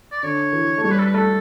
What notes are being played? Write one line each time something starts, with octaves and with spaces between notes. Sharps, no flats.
D5
D3 C#5
E3
A3
G3 C#5
B4
A4
B4
A3 A4